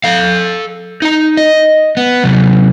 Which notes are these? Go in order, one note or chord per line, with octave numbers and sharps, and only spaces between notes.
A4 F5
D#4 A#5
D#5
B3
C3 F#3